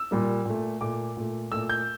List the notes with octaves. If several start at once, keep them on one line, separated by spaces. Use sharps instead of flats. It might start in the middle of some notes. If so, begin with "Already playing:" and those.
Already playing: E6
A#2 G3 A#3
A#2 A3
A#2 A3 D6
A#2 A3
A#2 A3 E6
G6